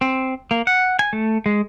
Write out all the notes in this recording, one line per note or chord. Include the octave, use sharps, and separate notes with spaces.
C4
A#3
F#5
G#5
A3
G#3